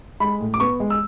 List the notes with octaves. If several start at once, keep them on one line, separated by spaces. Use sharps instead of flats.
G#3 B5
A2
D6
B3 C#6
G#3
E6